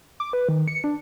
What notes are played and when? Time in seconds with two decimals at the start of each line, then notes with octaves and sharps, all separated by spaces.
0.20 D6
0.33 B4
0.49 D#3
0.68 C#7
0.84 D4